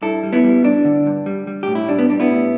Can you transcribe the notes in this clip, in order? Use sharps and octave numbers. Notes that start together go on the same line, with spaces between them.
G2 E4 A4
G3
B3 E4
G3
G2 D4
D3
G2
G3
G3
A2 G4
E4
G3 D4
B3
G3 D4
B3 E4
A2